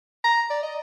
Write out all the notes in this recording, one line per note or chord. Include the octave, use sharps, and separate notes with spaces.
A#5
D5
D#5